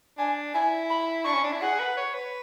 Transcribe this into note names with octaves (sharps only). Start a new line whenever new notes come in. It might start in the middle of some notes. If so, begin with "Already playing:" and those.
D4 G#5
E4 G#5
B5
D4 C#6
C#4
D4
E4
G#4 F#5
B4
C#5
B4